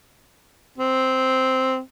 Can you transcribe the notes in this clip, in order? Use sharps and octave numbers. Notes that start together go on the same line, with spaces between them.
C4